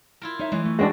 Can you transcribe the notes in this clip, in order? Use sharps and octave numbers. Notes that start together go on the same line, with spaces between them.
E4 F4 A#4
D#4 C#5 E5
E3 G#3 C#5
A3
G#3 C4 D4 F#4 F#5 G5